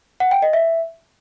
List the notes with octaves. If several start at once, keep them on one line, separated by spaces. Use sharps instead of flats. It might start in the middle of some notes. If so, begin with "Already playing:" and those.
F#5
G5
D#5
E5